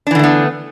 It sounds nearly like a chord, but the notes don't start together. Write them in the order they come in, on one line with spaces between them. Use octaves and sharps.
D4 E3 D3 A3 B3